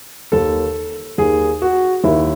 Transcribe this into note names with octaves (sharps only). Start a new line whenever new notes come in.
D#2 D#3 A4
D#2 D#3 G#4
F#4
D#2 D#3 E4